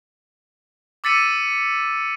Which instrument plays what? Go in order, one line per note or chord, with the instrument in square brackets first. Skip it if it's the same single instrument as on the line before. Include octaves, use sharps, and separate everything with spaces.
[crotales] D6 E6 A6 B6 C#7 D#7